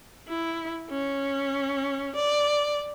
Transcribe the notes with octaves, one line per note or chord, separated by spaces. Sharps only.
E4
C#4
D5